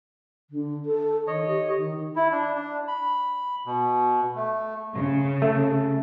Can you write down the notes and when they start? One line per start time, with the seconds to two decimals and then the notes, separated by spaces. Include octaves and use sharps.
0.50 D3
0.86 A4
1.27 D#3 C#5 D#5
1.47 G4
1.77 D#3
2.16 E4
2.32 D4
2.55 D4
2.88 B5
3.66 B2
4.36 A3
4.96 C#3
5.42 A3